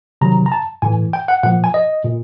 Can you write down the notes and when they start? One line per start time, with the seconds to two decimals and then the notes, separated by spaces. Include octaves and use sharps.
0.21 C3 D#3 F#3 A#5
0.46 A#5
0.52 A5
0.82 A2 E3 G#5
1.13 G5
1.28 F#5
1.43 A#2 F3 F#5
1.64 G#5
1.74 D#5
2.05 A#2